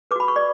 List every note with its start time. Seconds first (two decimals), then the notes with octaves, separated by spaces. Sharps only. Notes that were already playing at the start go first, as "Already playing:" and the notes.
0.11 B4 D6
0.16 F#4 B5
0.28 C#6
0.36 D5